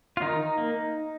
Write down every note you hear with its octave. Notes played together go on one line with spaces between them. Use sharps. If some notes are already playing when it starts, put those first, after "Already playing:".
F4
D#3 D#4
A#3